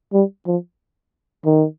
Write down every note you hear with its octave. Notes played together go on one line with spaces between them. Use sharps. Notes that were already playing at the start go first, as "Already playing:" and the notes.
G3
F3
D#3